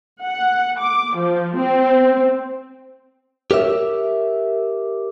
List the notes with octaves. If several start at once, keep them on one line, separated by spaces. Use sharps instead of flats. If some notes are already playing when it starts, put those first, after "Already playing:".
F#5
D6
F3
C4
G4 A#4 C#5 E5